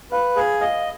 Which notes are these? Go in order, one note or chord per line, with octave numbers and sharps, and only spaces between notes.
B4 F5
G#4 F5
D#5 F5